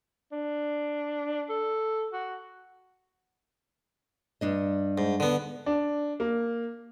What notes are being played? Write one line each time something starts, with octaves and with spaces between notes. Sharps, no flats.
D4
A4
F#4
G2 D4 D#5
G#2
D3 B3
D4
A#3